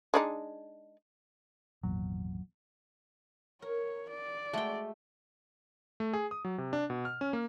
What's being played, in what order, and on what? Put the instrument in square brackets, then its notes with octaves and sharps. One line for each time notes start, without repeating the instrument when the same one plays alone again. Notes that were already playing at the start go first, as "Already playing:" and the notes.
[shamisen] G#3 D4 D#4
[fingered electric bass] G#1 E2 A#2 [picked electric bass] F#3
[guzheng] A#4 [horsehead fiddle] C#5
[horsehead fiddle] D5
[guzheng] G#3 F#4 [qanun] A3 G5
[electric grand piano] A3
G#4
D#6
F#3
C3
D4
B2
F6
C#4
A#3